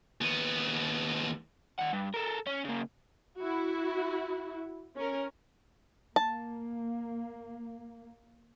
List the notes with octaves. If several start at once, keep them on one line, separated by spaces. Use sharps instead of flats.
D#2 B3
D#3 F#5
G2
A4 A#4
C#4
C#3 A#3
E4 F#4
C#4 A#4
A#3 A5